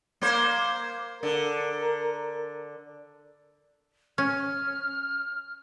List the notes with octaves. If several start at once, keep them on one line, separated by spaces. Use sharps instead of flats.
A#3 C5
D3 A#4
C#4 F6